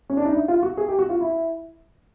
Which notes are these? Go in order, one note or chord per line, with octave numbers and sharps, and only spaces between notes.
C#4
D4
D#4
E4
F4
F#4
G#4
G4
F#4
F4
E4